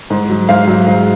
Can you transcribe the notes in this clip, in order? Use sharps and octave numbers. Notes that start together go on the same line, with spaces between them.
G#2
F#3
G#2 F5
F#3
G#2